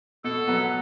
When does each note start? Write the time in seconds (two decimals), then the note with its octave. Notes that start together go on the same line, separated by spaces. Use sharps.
0.24 B2 A4
0.48 F#3 B3